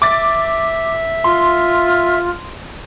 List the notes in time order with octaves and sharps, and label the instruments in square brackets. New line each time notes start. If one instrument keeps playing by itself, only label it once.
[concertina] E5 [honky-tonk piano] D6 A6
[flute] F4 [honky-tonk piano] C6